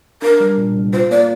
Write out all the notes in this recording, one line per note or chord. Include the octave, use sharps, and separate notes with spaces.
D4 A#4
G3
A#2
C2
F4 C5
A#3 D5